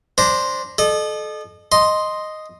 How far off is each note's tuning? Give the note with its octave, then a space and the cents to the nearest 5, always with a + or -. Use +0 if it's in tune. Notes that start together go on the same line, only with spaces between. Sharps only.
D4 +0 C5 +0 A#5 +0
A4 -30 D#5 -35
D#5 +0 C6 +0